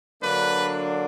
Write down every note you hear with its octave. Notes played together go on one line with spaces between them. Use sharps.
D3 F#3 A#3 D4 B4